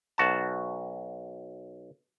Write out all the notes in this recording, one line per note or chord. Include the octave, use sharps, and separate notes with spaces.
B1 F#4 A5